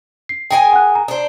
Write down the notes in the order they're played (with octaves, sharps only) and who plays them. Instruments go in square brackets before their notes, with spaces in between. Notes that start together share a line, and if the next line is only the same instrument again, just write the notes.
[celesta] C7
[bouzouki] G#4 A#4 G#5 [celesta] G5
[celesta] F#5 F#6
A#5
[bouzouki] D4 C5